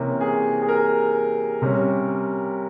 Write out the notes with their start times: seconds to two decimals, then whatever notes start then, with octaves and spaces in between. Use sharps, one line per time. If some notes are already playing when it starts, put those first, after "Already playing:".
Already playing: C3 E3 A#3 C#4 A#4
0.21 G#4
0.62 G#4
0.68 A#4
1.62 C3 G3 C#4